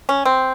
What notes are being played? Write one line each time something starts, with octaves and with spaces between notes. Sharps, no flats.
C#4
C4